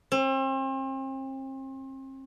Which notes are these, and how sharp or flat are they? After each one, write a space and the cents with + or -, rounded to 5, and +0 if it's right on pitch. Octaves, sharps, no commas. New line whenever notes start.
C4 +40